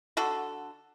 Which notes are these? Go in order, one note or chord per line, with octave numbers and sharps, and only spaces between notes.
D3 F#4 A4